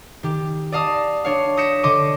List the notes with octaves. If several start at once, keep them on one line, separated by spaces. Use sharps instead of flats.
D#3 G4
D5 D#5 F5 A5 D#6
D4 C#5 F5
D#6 G6 A#6 B6 C#7 E7
D3 D#5 C6 D6 D#7